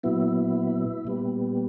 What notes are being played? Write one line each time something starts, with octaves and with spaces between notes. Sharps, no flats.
A#2 F#3 B3 E4
A#2 G3 B3